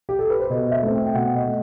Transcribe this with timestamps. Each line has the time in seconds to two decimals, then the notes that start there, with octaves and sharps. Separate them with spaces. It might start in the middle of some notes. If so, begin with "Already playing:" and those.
0.09 G4
0.19 A4
0.30 B4
0.40 C5
0.50 B2 D#5
0.71 E5
0.83 A3 C4
0.94 G5
1.05 G5
1.14 B2 F#5
1.36 D#5
1.48 A3